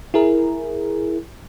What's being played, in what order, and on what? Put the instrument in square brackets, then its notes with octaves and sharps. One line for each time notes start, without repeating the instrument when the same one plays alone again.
[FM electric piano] E4 G#4 A#4